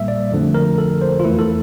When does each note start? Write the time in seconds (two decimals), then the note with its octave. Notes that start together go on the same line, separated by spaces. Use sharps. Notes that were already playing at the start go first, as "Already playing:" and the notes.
Already playing: A#1 A#2 G3 A#3 E5
0.08 D5
0.32 G1 F2 D3 F3 A3
0.54 A#4
0.78 A4
1.02 C5
1.20 F4
1.24 E2 E3 A3 E4
1.39 A4